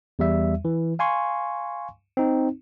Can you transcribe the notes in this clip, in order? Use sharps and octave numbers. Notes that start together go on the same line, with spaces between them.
E2 G3 E5
E3
F5 G#5 C6 C#6
C4 D#4